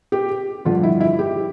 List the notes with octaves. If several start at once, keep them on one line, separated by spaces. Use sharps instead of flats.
G4
G2 D3 F3 F4
E4
E4
G4